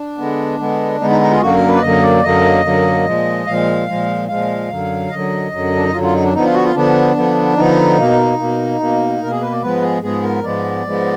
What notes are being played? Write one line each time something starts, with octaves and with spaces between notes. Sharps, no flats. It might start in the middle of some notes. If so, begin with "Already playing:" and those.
Already playing: D4
D3 G#3 B3
D3 G#3 B3
D3 G#3 B3 D#4
D#4
D#4
F4
G#4
F#2 D3 F#3 A#3 F#4
A#4
B4
D5
F#2 D3 F#3 A#3 D#5
D5
F#2 D3 F#3 A#3 D#5
F#2 D3 F#3 A#3
A#2 F3 G#3
A#2 F3 G#3 F5
A#2 F3 G#3
A#2 F3 G#3 F5
F#2 D3 F#3
F#2 D3 F#3 D#5
F#2 D3 F#3
D4
D#4
F#2 D3 F#3 F4
F4
D#4
D4
D3 F3 B3 D#4
F4
F#4
F4
D3 F3 B3 D4
D3 F3 B3
D3 F3 B3 D#4
B2 A#3
B2 A#3
B2 A#3
B2 A#3 A#4
G#4
B4
D5
G#2 F3 G#3 B3 B4
G#4
G#2 F3 G#3 B3 G#4
A#4
G#2 F3 G#3 B3 D5
G#2 F3 G#3 B3